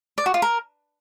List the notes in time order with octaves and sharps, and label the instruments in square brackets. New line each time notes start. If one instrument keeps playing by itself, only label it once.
[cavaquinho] D5
F#4
F4
A#4